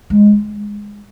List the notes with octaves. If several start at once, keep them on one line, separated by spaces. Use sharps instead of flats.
G#3